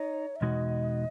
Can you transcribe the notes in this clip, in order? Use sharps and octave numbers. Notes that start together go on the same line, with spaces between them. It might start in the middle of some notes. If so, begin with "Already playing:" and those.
Already playing: D#4 C#5
E5
E2 B2 G#3 D#4 F#4 D#5